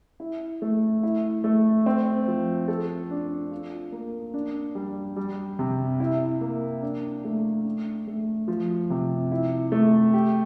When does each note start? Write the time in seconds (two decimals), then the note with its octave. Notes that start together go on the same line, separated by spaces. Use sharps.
0.20 E4
0.62 A3
1.03 E4
1.44 A3
1.86 C4
2.28 F3
2.68 A4
3.10 D4
3.51 F4
3.92 A#3
4.34 D4
4.75 G3
5.16 G3
5.59 C3
6.00 E4
6.41 A#3
6.82 D4
7.25 A3
7.65 D4
8.07 A3
8.48 F3
8.90 C3
9.32 E4
9.72 A3
10.14 G4